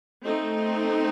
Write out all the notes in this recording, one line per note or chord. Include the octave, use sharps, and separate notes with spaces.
A3 C4 D#4